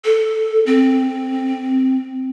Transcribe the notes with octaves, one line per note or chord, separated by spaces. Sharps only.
A4
C4